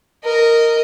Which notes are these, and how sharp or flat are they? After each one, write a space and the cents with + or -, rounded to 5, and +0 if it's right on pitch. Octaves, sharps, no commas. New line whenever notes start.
A#4 -10 D#5 +0